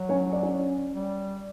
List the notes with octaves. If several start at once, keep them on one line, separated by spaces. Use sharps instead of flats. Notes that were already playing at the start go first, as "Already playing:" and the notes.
Already playing: F#3
C#4 C#5
D5
C#4 C#5
G3